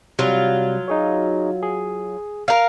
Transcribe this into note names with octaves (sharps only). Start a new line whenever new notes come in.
C3 F#3 G3 F4
D#4 G#4 C#5
G#4
A#4 F5